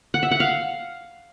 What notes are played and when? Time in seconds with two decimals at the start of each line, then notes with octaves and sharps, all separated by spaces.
0.14 F#5
0.23 E5
0.31 F#5
0.40 F5